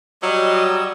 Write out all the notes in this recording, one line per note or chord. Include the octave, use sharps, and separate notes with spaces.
F#3 G3 D#5 E6